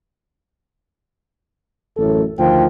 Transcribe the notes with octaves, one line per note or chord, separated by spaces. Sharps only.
A1 F#2 A2 A4
D2 D#3 F3 G5